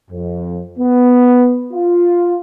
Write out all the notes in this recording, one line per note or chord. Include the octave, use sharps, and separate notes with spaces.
F2
B3
F4